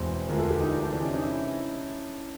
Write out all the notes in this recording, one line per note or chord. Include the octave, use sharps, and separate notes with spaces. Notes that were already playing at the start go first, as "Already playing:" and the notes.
Already playing: E1 E2 B2 G#3 C4 C5
E1 D2 D3 F3 G#3 A#4
A4
G4
D#4
D4
D4
C3 E3 G#3 D4
C#4
D#4
E4